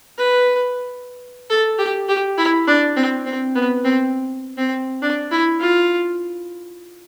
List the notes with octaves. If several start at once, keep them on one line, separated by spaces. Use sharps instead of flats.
B4
A4
G4
G4
E4
D4
C4
C4
B3
C4
C4
D4
E4
F4